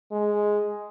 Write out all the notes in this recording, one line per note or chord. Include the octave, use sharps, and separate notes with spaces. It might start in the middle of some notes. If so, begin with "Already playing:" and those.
G#3